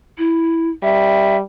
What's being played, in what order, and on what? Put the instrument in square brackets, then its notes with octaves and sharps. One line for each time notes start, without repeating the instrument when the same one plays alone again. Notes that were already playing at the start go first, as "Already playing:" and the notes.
[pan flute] E4
[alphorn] G3 [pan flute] E5